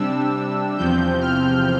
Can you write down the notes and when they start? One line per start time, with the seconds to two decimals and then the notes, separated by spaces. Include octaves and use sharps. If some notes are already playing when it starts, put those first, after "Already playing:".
Already playing: C3 G3 D4 E6
0.77 E2 C3 F3 C4 G6
1.21 F6